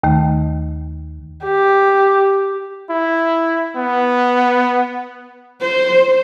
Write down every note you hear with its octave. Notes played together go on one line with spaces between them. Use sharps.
D#2 D#3 A3
G4
E4
B3
C5